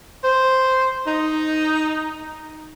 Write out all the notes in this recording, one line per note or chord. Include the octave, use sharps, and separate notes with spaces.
C5
D#4